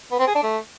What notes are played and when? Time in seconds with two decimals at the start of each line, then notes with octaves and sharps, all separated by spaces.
0.11 B3
0.19 C4
0.27 G#4
0.35 D4
0.43 A3